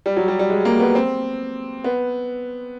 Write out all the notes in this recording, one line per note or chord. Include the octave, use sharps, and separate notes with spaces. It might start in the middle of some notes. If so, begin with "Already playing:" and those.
G3
F#3
G3
G3
G#3
A#3
B3
C4
B3